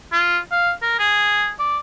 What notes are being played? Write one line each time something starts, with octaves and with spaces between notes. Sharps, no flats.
F4
F5
A#4
G#4
D5